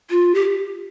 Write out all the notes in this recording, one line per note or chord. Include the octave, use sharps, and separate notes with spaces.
F4
G4